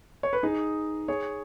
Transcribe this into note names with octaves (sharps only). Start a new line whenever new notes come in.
C#5
B4
D#4 G#4
G#4 C#5